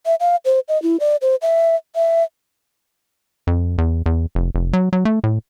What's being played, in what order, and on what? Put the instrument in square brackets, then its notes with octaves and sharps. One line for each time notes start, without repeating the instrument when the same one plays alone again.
[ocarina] E5
F5
C5
D#5
E4
D5
C5
E5
E5
[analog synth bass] F2
E2
E2
F1
F1
F#3
F#3
A3
A2